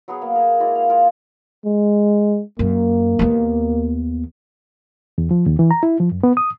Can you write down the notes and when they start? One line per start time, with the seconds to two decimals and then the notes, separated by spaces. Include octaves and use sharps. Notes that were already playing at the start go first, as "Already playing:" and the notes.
0.08 F#3 B3 G#4
0.22 A#3
0.35 A#4 G#5
0.60 G#3 E4 F#4 D5
0.75 F5
0.89 F4 G#4 A#4
1.65 G#3
2.59 F#2 A#3
3.19 D#2 B3
5.18 E2
5.31 F3
5.46 D#2
5.59 E3
5.71 A#5
5.83 E4
6.00 F3
6.11 F#2
6.23 B3
6.37 D#6